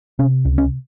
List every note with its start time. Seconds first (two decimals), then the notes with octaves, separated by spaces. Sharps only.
0.19 C3 C#4
0.45 C#2
0.58 C#4